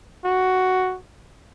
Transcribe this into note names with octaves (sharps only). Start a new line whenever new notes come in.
F#4